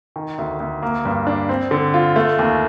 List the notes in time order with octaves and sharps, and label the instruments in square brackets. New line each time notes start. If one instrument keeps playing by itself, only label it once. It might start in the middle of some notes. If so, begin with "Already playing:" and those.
[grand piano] D#3
D2
D2
A#3
G2
D4
C4
D3
F4
A3
D#2